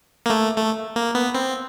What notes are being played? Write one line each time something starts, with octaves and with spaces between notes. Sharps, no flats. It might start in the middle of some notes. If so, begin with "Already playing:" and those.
A#3
A3
A3
A#3
B3
C4